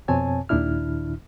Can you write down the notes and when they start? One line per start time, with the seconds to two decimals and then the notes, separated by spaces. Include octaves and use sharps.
0.08 F2 B2 C4 C#5 G#5 A5
0.49 D#2 A#2 D#3 D4 E4 F6